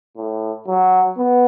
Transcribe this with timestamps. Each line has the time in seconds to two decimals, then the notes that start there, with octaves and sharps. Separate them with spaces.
0.17 A2
0.68 F#3
1.17 B3